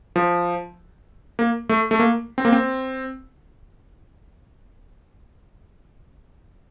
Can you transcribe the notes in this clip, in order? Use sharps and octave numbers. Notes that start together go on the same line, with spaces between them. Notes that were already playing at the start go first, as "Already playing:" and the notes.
F3
A#3
A3
A3
A#3
C4
A#3
C4